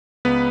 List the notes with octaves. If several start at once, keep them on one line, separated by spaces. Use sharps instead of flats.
C#2 B3 B4